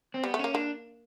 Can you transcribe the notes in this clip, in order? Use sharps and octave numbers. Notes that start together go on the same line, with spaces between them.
C4
G3 B3
A3
A#3 C#4
A#3 D4